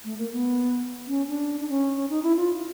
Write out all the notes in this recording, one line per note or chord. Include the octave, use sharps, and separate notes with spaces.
A3
A#3
B3
C#4
D4
D4
C#4
D#4
E4
F4